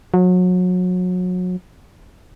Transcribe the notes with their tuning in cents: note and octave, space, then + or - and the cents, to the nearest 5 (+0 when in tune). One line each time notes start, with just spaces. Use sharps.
F#3 -30